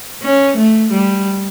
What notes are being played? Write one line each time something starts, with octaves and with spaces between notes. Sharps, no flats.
C#4
A3
G3